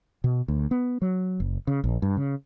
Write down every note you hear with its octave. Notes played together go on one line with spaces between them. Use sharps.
B2
D2
B3
F#3
F#1
C#3
A#1
G2
C#3